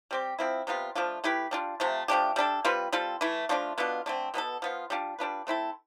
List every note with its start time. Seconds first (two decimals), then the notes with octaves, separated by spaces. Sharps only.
0.11 G3 C4 G4
0.39 F3 C4 E4
0.67 C3 G3 B3 F4
0.95 F3 A3 D4 F4
1.24 A3 E4 G4 B4
1.51 G3 D4 F4
1.80 C3 F3 A3
2.08 F3 A3 D4 G4
2.36 G3 D4 A4
2.65 G3 C4 F4 B4
2.93 G3 C4 F4 A4
3.21 E3 A3 E4
3.49 F3 A3 D4 F4
3.78 B2 B3 D4 F4
4.06 D3 A3 C4
4.34 B2 B3 D4 A4
4.62 F3 B3 F4
4.90 G3 D4 F4
5.19 G3 D4 F4 B4
5.47 A3 C4 E4 A4